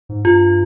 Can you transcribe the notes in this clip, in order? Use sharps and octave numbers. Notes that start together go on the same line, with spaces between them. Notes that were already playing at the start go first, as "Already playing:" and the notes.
G#2
G2 F4